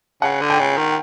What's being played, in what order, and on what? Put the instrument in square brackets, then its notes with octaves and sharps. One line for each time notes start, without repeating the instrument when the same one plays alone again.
[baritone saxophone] C#3 [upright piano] F#5
[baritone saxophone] D3
[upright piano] G5
[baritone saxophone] C#3
D#3